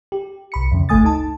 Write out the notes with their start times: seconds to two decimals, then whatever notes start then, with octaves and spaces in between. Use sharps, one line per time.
0.12 G4
0.52 C2 B5 C#7
0.72 F2 C#3
0.89 G1 C#2 A3 G#5 D#6 A6
1.04 D#4 A5